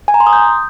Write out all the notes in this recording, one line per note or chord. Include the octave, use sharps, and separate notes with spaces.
G#5
A#5
C6
D#6
G6